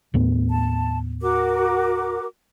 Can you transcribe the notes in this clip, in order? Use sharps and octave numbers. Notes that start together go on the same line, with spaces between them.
D#2 A2 B3
A5
F#4 A#4 D6